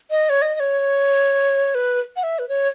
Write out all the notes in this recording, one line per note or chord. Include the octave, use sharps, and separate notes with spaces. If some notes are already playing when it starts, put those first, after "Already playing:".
D#5
C#5
D#5
D#5
C#5
B4
F#5
E5
B4
C#5